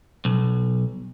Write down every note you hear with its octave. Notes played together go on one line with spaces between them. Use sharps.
B1